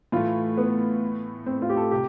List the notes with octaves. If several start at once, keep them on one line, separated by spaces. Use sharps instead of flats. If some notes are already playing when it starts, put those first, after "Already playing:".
A2 E3 A3 F4
B3
C4
F4
G4
A4
C3 G4